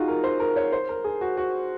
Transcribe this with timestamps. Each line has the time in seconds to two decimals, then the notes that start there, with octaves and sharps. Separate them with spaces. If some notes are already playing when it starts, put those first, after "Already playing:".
Already playing: D#4 F4 F#4 G#4
0.08 A#4
0.24 C5
0.40 A#4
0.56 C#5
0.72 C5
0.89 A#4
1.04 G#4
1.21 F#4
1.37 F#4